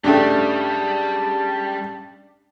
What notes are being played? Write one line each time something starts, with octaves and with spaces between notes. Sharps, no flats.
G2 C#3 G3 A3 D4 G4 A5